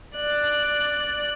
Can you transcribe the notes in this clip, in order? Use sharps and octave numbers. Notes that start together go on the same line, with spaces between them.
D5 F#6